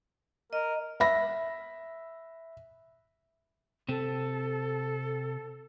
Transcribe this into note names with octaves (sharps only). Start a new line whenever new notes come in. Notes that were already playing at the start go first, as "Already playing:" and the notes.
A#4 D#5
E5 B5 A#6
C3 C4 A4